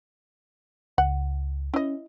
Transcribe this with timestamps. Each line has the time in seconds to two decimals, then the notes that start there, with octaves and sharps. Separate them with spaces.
0.98 C#2 F#5
1.74 C#4 E4 D#5